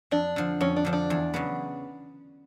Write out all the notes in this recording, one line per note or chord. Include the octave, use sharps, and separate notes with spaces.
F2 D4
D3 F3
F2 C#4
D4
D3 F3
D4
E2
C#3 F#3 B3